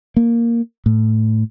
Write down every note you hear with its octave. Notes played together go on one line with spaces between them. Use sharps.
A#3
A2